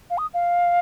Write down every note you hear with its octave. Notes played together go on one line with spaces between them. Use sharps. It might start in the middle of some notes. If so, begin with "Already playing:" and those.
F5
D#6
F5